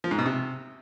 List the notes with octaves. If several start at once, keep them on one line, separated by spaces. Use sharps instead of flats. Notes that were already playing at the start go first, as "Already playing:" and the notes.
F3
G#2
B2
C3